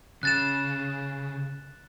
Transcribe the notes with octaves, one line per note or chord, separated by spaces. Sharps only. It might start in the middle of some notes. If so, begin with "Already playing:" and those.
C#3 F#6 A6 E7